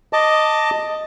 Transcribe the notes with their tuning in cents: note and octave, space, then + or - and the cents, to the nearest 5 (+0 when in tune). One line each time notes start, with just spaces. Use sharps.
D#5 +0 A5 +15 D6 +0